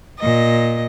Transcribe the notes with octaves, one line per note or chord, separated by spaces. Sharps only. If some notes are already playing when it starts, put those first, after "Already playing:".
A#2 D#5